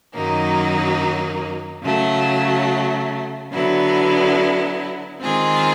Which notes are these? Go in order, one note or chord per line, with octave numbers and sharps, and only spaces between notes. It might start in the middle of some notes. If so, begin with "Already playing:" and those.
F#2 D#3 F#3 A#3 D#4
C#3 F#3 A3
D3 F#3 B3 E4
D#3 G#3 C4 F4 G#4